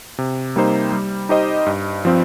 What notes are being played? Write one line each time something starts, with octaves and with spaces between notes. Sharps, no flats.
C3
G3 A#3 D#4 C5
G3
D#4 G4 C5 D#5
G2
F3 C4